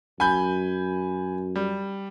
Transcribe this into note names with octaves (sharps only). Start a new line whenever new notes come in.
F#2 G#5 B5 G6
G3